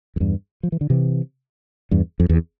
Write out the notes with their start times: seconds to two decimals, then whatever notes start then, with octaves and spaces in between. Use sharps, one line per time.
0.16 F2
0.20 E2 G2
0.63 F3
0.72 E3
0.81 D3
0.90 C3 E3
1.91 E2 G2
2.20 F2
2.29 E2